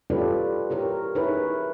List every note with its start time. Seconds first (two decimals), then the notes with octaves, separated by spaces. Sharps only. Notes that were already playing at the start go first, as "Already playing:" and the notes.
0.10 F4 G4 A4 B4 C#5 D5
0.70 E4 G4 A#4 C#5
1.15 D#4 E4 G#4 A#4 B4 C#5